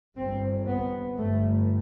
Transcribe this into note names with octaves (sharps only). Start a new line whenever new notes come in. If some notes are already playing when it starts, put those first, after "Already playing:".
G1 G2 C4
B3
G1 G2 A3